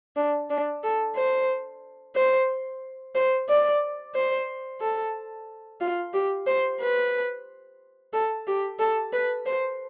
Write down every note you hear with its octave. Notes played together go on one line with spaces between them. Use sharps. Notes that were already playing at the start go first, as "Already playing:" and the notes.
D4
D4
A4
C5
C5
C5
D5
C5
A4
F4
G4
C5
B4
A4
G4
A4
B4
C5